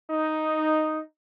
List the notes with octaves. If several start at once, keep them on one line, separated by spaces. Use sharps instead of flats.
D#4